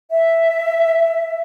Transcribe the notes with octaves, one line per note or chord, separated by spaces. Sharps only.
E5